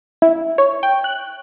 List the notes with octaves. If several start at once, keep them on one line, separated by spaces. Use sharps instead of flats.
E4
C#5
G5
F#6